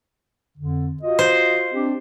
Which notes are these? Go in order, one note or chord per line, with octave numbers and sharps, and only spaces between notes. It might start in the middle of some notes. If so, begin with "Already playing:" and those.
F2 D3
F4 F#4 D#5
C5
C4 D4 G4